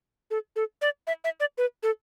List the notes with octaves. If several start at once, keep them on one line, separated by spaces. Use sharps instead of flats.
A4
A4
D5
E5
E5
D5
B4
A4